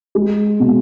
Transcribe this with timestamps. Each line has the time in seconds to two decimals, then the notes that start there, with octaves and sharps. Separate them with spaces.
0.15 G#3
0.60 B2